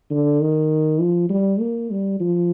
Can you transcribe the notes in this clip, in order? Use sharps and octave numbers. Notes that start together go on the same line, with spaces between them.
D3
D#3
F3
G3
A#3
G3
F3